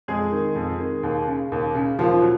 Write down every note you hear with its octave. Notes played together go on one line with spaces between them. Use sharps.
F2 G#3 G#4
D#3
F2
D#3
D#2
C#3
D#2
C#3
D#2 F3 F4
F#3